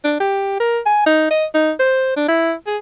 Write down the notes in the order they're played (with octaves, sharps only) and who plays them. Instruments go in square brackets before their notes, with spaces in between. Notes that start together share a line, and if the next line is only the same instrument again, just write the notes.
[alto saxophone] D4
G4
A#4
G#5
D#4
D#5
D#4
C5
D4
E4
G#4